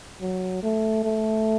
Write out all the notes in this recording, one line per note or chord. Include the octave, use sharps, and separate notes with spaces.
F#3
A3
A3